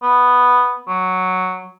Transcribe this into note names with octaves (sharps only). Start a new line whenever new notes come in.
B3
F#3